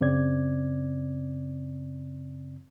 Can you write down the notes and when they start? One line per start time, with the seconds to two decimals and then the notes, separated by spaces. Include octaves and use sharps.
0.01 F#2 C#3 C4 D5 G#6